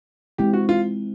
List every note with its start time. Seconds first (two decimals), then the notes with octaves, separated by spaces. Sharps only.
0.38 G#3 C4 E4 G4
0.53 F#4
0.69 F4